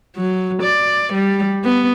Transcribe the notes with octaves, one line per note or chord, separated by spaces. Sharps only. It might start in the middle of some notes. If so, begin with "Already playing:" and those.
F#3
D5
G3
B3